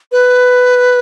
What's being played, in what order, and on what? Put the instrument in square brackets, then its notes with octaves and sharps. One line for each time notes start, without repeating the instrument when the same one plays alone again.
[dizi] B4